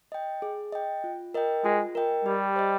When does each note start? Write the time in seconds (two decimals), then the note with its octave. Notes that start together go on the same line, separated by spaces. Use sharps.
0.12 D#5 G5
0.42 G#4
0.73 D#5 G5
1.04 F4
1.34 A#4 D#5 G5
1.64 G#3 F4
1.95 A#4 D#5 G5
2.25 G3 G4
2.56 C5 D#5